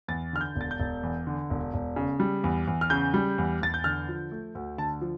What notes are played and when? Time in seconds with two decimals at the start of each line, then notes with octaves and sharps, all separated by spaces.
0.08 E2 A6
0.33 D3 F6
0.41 G6
0.56 E1
0.61 A6
0.71 G6
0.80 E1
1.03 E2
1.27 D3
1.50 E1
1.74 E1
1.96 C#3
2.20 G3
2.44 E2
2.67 E2
2.81 F6
2.90 C#3 G6
3.14 G3
3.38 E2
3.61 E2 A6
3.74 G6
3.84 D3 F6
4.08 F3
4.32 A3
4.55 D2
4.78 D3 A5
5.01 F3